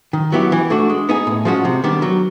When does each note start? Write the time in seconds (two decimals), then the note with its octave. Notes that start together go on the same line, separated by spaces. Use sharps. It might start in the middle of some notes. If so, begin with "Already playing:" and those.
0.13 D#3
0.32 F#3 B3 E4 G4
0.52 E3
0.70 A3 D4 F#4
0.90 G#3
1.09 B3 D#4 G#4
1.27 A2
1.45 F3 G#3 C#4 F#4
1.65 C3
1.84 D#3 G3 B3 D4
2.02 F#3